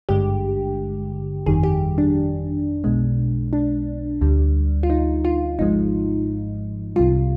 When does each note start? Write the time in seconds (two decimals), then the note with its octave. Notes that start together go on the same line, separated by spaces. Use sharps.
0.09 G#1 G2 D3 G#3 G4
1.46 G1 F2 D#3 G3 G#4
1.63 G4
1.98 D4
2.84 B1 B2 G#3
3.53 D4
4.21 D2 D3 G3
4.83 F4
4.90 D#4
5.25 F4
5.59 G#1 G#2 F3 G#3 D#4
6.96 C2 C3 G3 F4